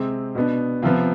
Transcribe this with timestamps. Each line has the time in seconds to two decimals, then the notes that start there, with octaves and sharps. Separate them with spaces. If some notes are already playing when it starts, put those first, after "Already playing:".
Already playing: C3 G#3 C4
0.35 B2 B3 D4
0.82 C3 F3 B3 F4